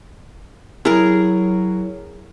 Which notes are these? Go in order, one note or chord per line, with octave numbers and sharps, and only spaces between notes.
F#3 E4 G#4 A#4